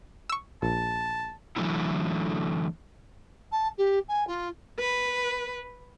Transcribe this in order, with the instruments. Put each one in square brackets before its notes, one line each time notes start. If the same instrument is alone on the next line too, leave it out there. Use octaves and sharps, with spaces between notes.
[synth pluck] C#6 E6
[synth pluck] A#1 [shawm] A5
[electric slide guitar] D3 E3 F#3 A3 C#4 E4
[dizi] A5
G4
G#5
F4
[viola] B4